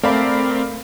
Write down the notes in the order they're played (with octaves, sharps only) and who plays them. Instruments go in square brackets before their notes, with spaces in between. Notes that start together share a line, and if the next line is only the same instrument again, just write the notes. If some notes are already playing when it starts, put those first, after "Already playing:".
[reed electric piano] A3 [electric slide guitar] C4 [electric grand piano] A#4 F5 B5 [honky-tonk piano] D5